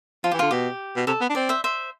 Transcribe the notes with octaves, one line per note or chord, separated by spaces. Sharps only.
F3 F4
E3 G4
D3 F4
B2 G4
B2
C3 A4
B3
D4
C4 D5
C5 E5
C5 E5